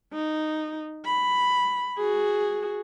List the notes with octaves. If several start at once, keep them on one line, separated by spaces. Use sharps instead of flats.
D#4
B5
F#4 G#4